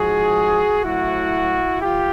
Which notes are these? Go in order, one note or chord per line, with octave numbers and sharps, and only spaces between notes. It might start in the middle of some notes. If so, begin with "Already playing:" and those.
Already playing: G#2 F3 F#4 G#4
A2 F#3 E4 F#4
F3 F4 G4